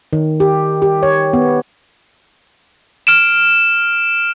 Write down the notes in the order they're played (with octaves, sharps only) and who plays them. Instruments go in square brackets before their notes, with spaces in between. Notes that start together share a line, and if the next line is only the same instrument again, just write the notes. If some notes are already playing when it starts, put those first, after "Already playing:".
[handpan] D#3
G4
G4
C#5
B3
[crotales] F6 D7 E7